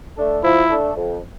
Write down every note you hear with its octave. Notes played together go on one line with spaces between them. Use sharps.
A3 D4 A4
F3 E4
A3 D4 A4
F2